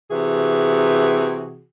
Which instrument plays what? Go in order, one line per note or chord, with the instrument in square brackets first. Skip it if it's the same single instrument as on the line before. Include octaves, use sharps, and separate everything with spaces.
[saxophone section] C3 E3 F#4 G#4